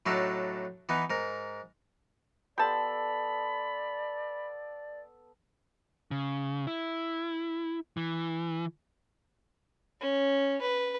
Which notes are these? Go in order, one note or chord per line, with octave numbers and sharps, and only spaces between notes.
A2 F#3 D4 D#4 A4
E3 B3 D#4
G#2 A#4
B3 G4 A4 D5 A5 B5 C6
C#3
E4
E3
C#4
B4